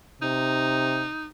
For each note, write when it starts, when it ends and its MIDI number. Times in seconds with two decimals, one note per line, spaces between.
0.22 1.07 48
0.22 1.27 63